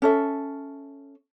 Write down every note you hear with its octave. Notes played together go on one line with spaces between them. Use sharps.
C#4 A4 E5